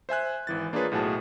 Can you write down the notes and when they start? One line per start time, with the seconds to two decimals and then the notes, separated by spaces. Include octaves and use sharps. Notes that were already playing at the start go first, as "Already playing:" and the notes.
0.09 C5 E5 G#5 F#6
0.47 G#1 E3 A6
0.73 A#3 D4 F4 G#4 B4 C#5
0.91 B1 A2 F#4 G#4 A5